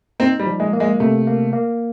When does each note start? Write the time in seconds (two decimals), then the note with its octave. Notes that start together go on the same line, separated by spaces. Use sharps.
0.20 C4 D#4
0.39 G3
0.46 F3
0.60 G#3
0.73 A#3
0.80 G#3
1.00 C3 A3
1.27 A#3
1.53 A#3